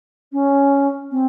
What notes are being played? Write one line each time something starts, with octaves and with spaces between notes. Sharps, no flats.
C#4
C4